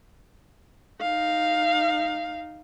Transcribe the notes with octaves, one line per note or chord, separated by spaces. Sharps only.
D#4 F5